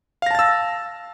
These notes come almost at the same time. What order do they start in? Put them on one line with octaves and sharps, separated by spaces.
F5 A#6 A5 A6 E6